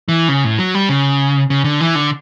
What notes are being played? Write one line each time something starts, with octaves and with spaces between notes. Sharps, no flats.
E3
C#3
A2
F#3
G3
C#3
C#3
D3
E3
D3